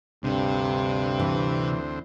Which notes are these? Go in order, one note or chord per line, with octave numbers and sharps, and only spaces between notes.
D2 G2 C3 C4
E3